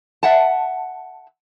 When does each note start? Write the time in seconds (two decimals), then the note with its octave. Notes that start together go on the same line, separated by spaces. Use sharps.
0.23 E5 F#5 A5